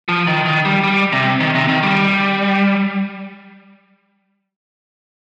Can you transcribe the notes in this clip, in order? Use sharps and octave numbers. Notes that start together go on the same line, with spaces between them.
F3
D#3
D#3
G3
G3
C3
D#3
C3
D#3
G3